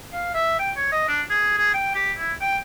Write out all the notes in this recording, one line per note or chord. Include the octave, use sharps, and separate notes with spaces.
F5
E5
G5
C#5
D#5
D4
G#4
G#4
G5
G4
E4
G5